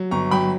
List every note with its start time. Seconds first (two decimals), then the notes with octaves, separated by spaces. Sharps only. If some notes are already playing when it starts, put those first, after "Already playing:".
Already playing: F#3
0.11 G1 A#5 C#6
0.31 F#3 G5 B5